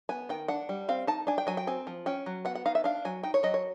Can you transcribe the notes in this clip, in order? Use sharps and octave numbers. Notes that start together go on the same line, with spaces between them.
B3 G#5
D#3 G5
D4 F#5
G3
C4 F5
D#4 A5
D4 G#5
G5
F#3 G#5
G5
C4 G#5
F3
C#4 G5
F#3
B3 F#5
F#5
D#4 F5
E5
D4 F5
F#3 G#5
D#4 G5
C#5
F#3 D#5
C#5